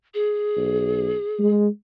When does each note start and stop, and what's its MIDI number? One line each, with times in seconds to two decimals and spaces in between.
0.14 1.51 68
0.57 1.14 35
1.39 1.68 56